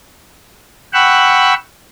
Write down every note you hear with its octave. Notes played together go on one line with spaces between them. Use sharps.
F#5 G5 B5 C#6 E6 F#6